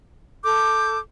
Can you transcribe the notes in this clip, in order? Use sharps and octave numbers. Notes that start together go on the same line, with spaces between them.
A4 D6 G6